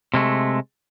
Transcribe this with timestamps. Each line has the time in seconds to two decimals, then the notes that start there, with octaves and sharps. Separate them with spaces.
0.14 C3 G#3 A3